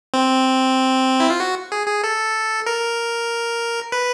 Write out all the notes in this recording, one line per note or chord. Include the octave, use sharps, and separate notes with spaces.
C4
E4
F4
F#4
G#4
G#4
A4
A#4
B4